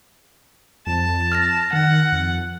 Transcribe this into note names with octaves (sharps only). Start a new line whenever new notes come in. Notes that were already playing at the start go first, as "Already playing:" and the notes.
F2 A5
F6 A6 A#6
D#3 F#5
F2